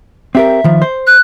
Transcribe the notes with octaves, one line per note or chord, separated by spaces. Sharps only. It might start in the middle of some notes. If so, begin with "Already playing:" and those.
C4 G4 A#4 E5
D#3 F3
C5
F#6